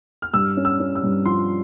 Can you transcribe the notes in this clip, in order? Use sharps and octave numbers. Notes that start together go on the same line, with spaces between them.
F6
G2 E6
C#4
E6
C#4
E6
G2
F3 C6